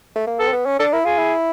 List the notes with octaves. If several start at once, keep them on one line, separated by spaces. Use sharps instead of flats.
A3
A#3
B3 A4
C4
B3
C#4
D4 A4
E4 A#4
F4 G#4
E4